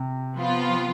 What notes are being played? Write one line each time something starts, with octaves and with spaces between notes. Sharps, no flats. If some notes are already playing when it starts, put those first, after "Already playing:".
Already playing: C3
F3 B3 F4